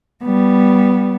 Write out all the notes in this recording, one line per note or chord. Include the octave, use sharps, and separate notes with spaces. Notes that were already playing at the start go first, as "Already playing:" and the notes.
G3 B3